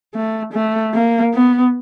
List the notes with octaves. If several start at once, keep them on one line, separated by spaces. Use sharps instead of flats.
A3
A3
A#3
B3